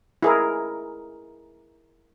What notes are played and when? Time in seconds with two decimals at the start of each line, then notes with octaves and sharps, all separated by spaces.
0.23 E4 G#4 A#4